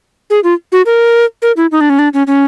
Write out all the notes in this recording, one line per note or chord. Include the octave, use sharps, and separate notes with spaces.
G#4
F4
F#4
A#4
A#4
E4
D#4
D4
C#4
D4
C#4
C#4